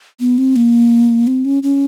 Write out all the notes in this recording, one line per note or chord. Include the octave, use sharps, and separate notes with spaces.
B3
C4
A#3
C4
C#4
C#4